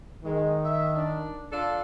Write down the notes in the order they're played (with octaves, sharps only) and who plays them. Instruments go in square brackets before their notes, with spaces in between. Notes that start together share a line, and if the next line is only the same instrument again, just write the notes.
[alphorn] D#3 [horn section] G#3
[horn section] E5
D4
D4 F4 A4